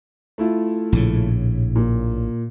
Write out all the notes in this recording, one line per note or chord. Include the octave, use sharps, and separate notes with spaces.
A3 E4 F4
A#1 A2 C#3
A#2